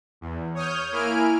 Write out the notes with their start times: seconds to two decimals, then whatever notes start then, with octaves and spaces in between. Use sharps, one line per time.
0.21 E2
0.55 C#5 D#6 F6 G6
0.92 A#3 E4 G#5 F6 D7